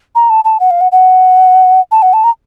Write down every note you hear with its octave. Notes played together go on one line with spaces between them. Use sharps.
A#5
A5
A5
F#5
F5
F#5
F#5
A5
F#5
A5
A#5